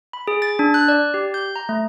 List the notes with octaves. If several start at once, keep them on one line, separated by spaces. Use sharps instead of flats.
B5
G#4
A6
D4
F#6
D5
G4
G6
A#5
A3